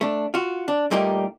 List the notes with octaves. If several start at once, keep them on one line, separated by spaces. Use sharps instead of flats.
A3 D4
F4 F#4
D4
A#2 G3 A3 A#3 D#4 G4